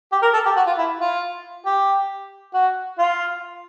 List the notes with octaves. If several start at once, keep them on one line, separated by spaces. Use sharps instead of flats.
G4
A#4
A4
G4
F#4
F4
E4
F4
G4
F#4
F4